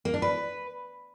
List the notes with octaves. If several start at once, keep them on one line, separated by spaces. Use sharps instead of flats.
A#3
D4
B4